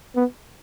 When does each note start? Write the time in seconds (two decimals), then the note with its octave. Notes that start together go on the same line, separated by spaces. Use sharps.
0.16 B3